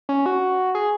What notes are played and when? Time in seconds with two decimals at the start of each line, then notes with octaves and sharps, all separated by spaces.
0.09 C#4
0.26 F#4
0.75 G#4